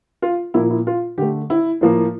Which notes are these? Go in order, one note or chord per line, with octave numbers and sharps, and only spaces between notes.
F4
A#2 F3 A#3 E4
E4
F4
D3 A3 G4
E4
A2 F3 A#3